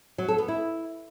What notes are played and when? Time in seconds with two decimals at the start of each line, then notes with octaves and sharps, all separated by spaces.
0.18 F#3
0.28 A4
0.38 B3
0.48 E4